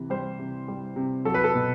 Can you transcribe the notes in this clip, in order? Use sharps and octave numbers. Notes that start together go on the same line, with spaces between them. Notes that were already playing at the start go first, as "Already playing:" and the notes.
Already playing: C3 E3
G3 C5
C3
G3
C3
F#3 A4
B4
A4
B2